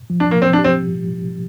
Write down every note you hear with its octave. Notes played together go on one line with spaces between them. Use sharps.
F3
D4
F3 A#3
F3 C4
D4
G4
C4